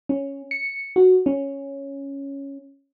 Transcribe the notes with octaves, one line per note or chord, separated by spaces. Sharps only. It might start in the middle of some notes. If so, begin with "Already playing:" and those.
C#4
C#7
F#4
C#4